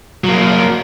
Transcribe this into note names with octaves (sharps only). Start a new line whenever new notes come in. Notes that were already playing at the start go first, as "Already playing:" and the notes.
F#3 A#3